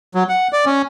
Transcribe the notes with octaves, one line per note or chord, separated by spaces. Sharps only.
F#3
F#5
D5
C#4